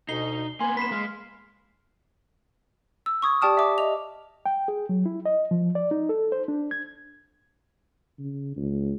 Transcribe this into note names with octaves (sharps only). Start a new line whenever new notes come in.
D2 B2 D#4 C7 G7
A#3 B3 G#5 C6
B5 B6 C7 E7
G#3 F5
E6
C#6 D#6 G#6
G4 D5 G5 A5 D#6 F6
E5 D6
D#5 F7
G5
G#4
F#3
E4
D#5
F3
D5
D#4
A4
C5
D4
G#6
C#3
C#2